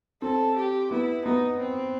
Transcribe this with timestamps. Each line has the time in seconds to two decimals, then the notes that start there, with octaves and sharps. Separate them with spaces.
0.22 C4 A4
0.56 G4
0.91 B3 E4
1.25 B3 D#4
1.60 C4